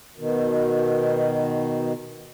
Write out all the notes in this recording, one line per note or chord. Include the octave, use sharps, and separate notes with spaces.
B2 D#3